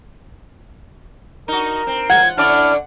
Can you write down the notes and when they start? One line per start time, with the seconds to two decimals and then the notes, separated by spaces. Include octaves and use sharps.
1.48 D#4 F#4 A#4
1.87 C4
2.10 F4 F#5 G#6
2.37 D3 C#4 D4 E4 D5 F6